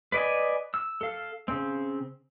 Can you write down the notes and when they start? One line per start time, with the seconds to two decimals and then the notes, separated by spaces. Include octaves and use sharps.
0.12 B4 D5 D#5 G#5
0.74 E6
1.01 A4 F5
1.48 C#3 C4